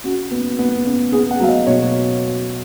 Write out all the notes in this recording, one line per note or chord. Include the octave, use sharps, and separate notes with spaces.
C#3 F#4
B3
B3
C#3
B3 G#4
F#5
F#3 F5
D#5
B2 C#5